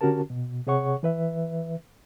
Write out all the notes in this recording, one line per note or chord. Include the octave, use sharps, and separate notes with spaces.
D3 C#4 F#4 G4 A#4 A5
B2
C3 G#4 C#5 F#5 C#6
E3 B4 E5